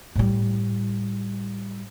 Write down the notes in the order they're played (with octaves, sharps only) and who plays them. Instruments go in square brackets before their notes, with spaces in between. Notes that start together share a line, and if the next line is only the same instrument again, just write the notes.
[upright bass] A2 G3